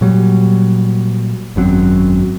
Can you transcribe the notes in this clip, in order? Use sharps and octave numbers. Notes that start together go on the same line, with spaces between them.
A#2 F#3 G3
G#1 F#2 F#3 C4